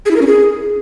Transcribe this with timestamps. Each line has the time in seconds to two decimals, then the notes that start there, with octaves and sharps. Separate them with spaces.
0.06 G#4
0.11 E4
0.16 A#4
0.21 C#4
0.27 G#4